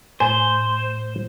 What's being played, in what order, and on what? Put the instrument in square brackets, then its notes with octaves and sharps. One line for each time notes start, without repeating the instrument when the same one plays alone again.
[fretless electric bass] A2 [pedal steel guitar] C5 [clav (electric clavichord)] G#5